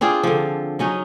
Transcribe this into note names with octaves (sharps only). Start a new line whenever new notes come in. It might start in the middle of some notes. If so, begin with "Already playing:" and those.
C4 D4 F4 G#4
D3 F3
F#3 C#4 D#4